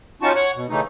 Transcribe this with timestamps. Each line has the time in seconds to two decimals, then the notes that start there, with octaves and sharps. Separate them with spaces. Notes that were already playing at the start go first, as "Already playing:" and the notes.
0.22 C#4 D#4 F4 F#4 A5 C#6
0.35 C#5 F#5 C#6
0.55 B2
0.69 C#3 E3 A3 D#4